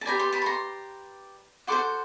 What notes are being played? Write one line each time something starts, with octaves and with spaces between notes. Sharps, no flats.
A5
G4 B4 D5 G#5 A#5
C6 D6
A5 B5
C#6
A#5 C6
F#4 A4 C5 C6 D6